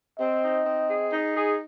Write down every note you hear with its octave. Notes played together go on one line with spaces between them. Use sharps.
C4 D#5
D#4
C4
G#4
D#4
G#4